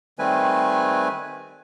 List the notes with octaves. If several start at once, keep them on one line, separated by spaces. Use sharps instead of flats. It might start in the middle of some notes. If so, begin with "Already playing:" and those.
D#3 G3 A3 C4 B4 G#5